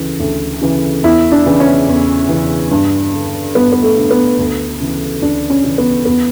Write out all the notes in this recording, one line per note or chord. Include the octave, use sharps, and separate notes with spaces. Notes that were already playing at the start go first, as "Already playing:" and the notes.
Already playing: D2 C#3 E3
D2
C#3 E3
E2 E4
D4
C#3 E3
C#4
E2
C#3 E3
G2
D3
G2 B3
B3
A3
D3
B3
D2
C#3 E3
D2 D4
C#4
C#3 E3
B3
E2 B3